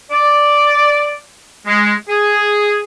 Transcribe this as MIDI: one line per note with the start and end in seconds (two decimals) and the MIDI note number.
0.12 1.21 74
1.66 1.93 56
2.10 2.82 68